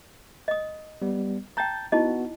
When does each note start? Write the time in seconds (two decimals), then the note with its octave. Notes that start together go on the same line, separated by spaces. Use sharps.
0.48 D#5 D#6
1.02 G3 B3
1.57 G5 A5 A#5 G6 A6
1.92 B3 D#4 E4 F#4 D#5